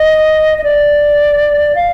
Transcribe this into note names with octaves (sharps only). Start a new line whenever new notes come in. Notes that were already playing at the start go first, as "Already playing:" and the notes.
Already playing: D#5
D#5
D5
F5